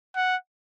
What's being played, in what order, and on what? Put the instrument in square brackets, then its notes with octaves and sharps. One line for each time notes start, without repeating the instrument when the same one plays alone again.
[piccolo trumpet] F#5